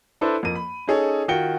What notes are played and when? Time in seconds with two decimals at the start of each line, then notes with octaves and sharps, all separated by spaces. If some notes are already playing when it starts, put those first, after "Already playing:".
0.21 D4 E4 A4 B4 C5 D5
0.43 F2 A#3 D#7
0.55 B5
0.88 C#4 D#4 G#4 A4 C#5
1.28 D#3 F4 F#4 G5 C#7 G7